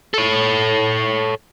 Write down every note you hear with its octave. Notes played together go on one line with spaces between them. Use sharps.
A4 C#5